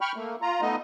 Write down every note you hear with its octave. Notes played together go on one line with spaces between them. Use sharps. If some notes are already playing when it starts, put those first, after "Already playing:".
G5 B5 C#6 F6
A3 A#3
F4 A#5
A3 B3 D#4 D#5